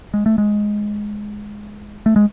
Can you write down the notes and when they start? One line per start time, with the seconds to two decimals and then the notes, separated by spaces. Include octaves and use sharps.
0.14 G#3
0.26 A3
0.38 G#3
2.06 A3
2.16 G#3